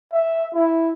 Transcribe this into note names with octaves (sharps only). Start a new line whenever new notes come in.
E5
E4